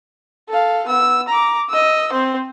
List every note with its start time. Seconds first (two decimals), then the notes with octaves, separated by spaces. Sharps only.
0.49 A4 F5
0.88 B3 E6
1.28 A#5 D6
1.70 D#5 E6
2.12 C4 C5